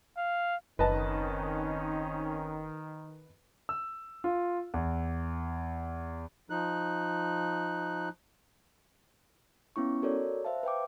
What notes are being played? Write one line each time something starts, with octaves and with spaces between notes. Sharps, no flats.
F5
F#1 D#3 C4 C#4 D#4 B4 D#5 A5
E6
F4
E2
F3 D#4 F#6
B3 C#4 E4 C#6
F#4 A4 A#4 C#5 D5
C5 E5 F5 A5
B4 E5 G5 D6